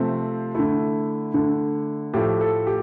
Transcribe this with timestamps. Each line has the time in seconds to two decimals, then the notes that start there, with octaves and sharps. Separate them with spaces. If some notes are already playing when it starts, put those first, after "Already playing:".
Already playing: C3 F3 A3 C4
0.55 D3 A3 E4
1.34 D3 A3
2.14 A2 F3 A3 G4
2.41 A4
2.67 G4